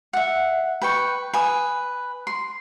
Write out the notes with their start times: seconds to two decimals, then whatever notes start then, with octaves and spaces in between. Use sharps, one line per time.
0.13 E5 F#5
0.82 B4 G5 C#6
1.33 B4 G#5 D#6
2.27 C6